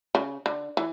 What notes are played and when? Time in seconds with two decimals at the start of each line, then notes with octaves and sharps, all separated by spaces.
0.15 C#3
0.46 D3
0.77 E3